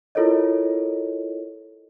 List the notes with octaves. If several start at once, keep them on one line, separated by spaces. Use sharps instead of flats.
E4 F4 A4 A#4 C#5 D#5